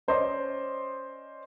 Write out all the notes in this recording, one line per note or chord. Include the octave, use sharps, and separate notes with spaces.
C#4 C5 D5 D#5 C6